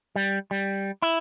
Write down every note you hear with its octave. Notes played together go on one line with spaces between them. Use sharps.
G3
G3
E4